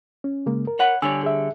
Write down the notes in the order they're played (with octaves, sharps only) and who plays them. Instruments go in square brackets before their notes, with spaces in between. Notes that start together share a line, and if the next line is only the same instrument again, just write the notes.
[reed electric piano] C#4
C#3 G#3 A#3
A#4
[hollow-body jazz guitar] C#5 F#5 B5
[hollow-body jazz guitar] D3 G3 C#5 [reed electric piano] G#5 E6
[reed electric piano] G#4 E5